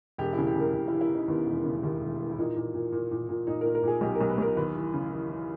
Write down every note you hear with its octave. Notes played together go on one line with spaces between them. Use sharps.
E1 G4
E4
C#3
G4
C#3 A#4
E1 G4
E4
E3
E4
E3 D#4
D#2 B3
E1
C#3
D#2
E1
E3
E4
A#2 D#4
A#2
A#2
A#2
A#2
A#2
A#2 D#4
A#2 A#4
A#4
A#2 G#4
B1 G4
A#4
B1
B4
B1 A#4
D#2 B4
E3
C#3
E3
E3